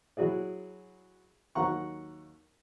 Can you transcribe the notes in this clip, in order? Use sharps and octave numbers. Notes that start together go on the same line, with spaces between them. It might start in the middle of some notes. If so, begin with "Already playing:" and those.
F#3 E4 F#4 G#4 D5
D#2 F#3 F#5 A#5 C#6